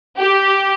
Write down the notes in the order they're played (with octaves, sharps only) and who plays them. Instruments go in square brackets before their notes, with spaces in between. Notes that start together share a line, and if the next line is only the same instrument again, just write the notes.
[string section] G4